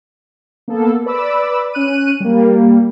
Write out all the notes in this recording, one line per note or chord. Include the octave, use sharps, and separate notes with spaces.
A#3 B3 A4
B4 D5 B5 D6 E6
C#4 F#6 D#7
G3 A#3